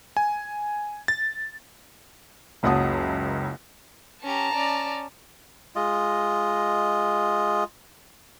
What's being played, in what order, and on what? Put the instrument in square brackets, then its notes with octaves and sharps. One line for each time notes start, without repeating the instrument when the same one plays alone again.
[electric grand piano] G#5
A6
[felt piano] F#1 C#2 F#3 F#5 A5 D#6
[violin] C#4 G4 [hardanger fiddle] A5 A#5
[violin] C#4 D5
[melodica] G#3 F4 D#5